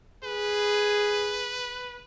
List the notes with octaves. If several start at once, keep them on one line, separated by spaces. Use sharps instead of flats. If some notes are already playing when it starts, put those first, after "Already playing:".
G#4 B4